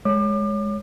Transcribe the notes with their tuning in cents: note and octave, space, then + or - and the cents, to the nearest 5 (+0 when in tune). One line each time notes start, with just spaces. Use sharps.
G#3 +0 C#5 +10 D6 +35